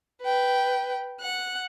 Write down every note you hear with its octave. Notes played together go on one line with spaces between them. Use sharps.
B4 G5
F#5 F#6